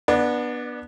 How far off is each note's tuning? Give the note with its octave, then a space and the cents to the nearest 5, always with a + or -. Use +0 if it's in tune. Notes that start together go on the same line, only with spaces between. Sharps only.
B3 -15 D4 +15 D5 +40